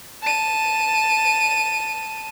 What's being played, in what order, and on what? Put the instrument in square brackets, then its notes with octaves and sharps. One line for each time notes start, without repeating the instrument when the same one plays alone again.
[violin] A5 D#7